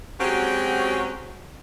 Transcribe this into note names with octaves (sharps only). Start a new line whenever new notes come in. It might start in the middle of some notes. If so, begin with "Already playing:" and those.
F#3 G#3 C4 C#4 F#4 G4